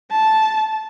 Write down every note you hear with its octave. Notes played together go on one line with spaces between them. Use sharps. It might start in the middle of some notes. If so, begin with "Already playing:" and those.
A5